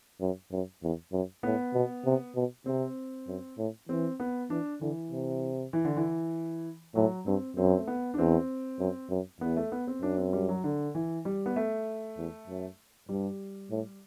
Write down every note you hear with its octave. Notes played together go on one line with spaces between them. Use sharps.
F#2
F#2
E2
F#2
A2 B3
B2
C3
B2
C3 C4
F#2
A2
E3 C4
B3
E3 D4
D3 E3
C3
E3
D3
E3
A2 F#3
G2 C4
F#2 C4
A3
B3
D4
E2 C4
F#2
F#2
E2 B3
A3
B3
C4
F#2 D4
C4
G3
F#3
D3
E3
G3
B3
A3
E2
F#2
G2 G3
A2